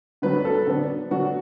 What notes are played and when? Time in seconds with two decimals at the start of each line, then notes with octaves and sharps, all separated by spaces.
0.22 D3 F#3 B3 D4 B4
0.45 A4
0.67 D3 F#3 B3 D4
1.11 D3 F#3 B3 D4 F#4